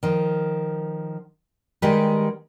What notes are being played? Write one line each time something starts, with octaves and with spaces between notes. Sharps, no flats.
D#3 F3
D#3 G3 G#3 D#4 G4 B4